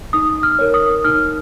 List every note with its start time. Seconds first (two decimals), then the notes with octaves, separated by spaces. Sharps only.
0.13 D#4 D#6
0.43 F6
0.59 A#4 C#5
0.74 D#6
1.04 D#4 F6